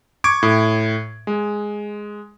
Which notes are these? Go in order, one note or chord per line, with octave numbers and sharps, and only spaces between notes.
C#6 D6 G#6 D7
A2
G#3